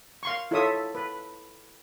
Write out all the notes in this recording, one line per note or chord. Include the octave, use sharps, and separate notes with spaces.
F5 C6 C#6
E4 F4 A4 C#5 E5 D#6
B4